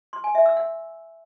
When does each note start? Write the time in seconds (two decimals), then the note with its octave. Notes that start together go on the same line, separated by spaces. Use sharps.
0.13 C6
0.24 G#5
0.35 E5
0.46 E6
0.57 F#5